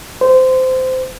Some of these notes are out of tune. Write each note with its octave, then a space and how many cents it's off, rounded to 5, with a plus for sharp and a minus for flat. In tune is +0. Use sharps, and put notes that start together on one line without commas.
C5 -20